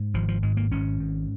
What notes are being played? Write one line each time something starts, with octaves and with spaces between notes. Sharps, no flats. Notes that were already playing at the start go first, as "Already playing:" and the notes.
Already playing: G#2
G#1 F3
F3
G#2 G#3
A#3
G#1 C#4
G#2